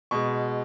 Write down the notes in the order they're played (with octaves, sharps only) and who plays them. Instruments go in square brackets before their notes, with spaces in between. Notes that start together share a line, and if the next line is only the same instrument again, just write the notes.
[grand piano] B2 G#3 C#6